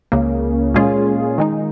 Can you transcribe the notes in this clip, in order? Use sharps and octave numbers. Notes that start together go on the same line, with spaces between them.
C#2 C#3 A#3
A#2 G#3 C#4 F4 G#4
D#3 G#3 D#4